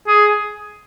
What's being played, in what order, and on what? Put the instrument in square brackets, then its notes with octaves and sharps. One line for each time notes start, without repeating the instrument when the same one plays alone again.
[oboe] G#4